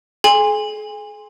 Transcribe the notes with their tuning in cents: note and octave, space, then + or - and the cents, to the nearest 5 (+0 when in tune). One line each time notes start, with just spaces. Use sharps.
G#4 +45 G#5 -30 C6 +0